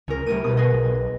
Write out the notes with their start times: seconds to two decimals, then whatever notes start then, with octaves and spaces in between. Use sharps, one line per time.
0.08 C#2 C#4 A#4
0.26 C2 A2 A#4 D#7
0.44 B2 B4 D#6
0.57 G#4 B4 D#5
0.74 B1